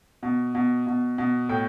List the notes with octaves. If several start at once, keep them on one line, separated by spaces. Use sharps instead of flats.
B2
B2
B2
B2
A2 G5